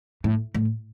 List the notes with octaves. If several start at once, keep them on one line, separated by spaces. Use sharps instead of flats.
A2
A2